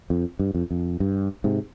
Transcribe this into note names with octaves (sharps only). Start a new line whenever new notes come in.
F2
G2
F2
F2
G2
G#2 C3